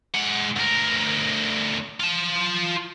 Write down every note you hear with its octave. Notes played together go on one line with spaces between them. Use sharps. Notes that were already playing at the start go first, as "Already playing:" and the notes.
G#3 F#5
D2 A#4
F4 A5